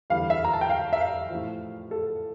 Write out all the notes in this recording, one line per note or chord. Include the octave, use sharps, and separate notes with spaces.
E2 D3 G3 F5
E5
A#5
A5
G5
F5
E5
F5
A2 F3
A4